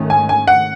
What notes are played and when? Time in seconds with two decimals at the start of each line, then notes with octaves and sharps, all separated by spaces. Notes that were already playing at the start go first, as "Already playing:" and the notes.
Already playing: G#2 D#3 A3 C#4
0.10 G#5
0.29 G#5
0.48 F#5